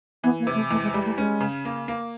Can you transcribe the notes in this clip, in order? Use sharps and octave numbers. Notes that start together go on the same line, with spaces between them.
E3 B3
A#3
C3
A3
E2 A3
G#3
G3 G#3
A3
G#3 C#4
C#3
A#3
A#3